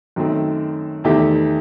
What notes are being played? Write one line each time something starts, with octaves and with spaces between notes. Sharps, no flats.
F#2 D#3 A3 C4
E2 D#3 A3 E4 G4